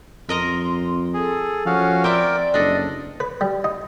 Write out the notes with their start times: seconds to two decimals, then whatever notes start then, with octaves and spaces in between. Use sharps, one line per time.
0.29 F2 A#4 D#5 A#5 C6
1.14 G#4 A4
1.66 F3 C#4 F#4 F5
2.04 C4 A#4 D5 E5 G5 D6
2.54 F#1 D4 A4 D#5
3.20 B4
3.41 G3
3.64 D#4